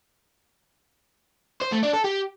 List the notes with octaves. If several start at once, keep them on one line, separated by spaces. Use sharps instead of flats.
C5
A3
D4
A4
G4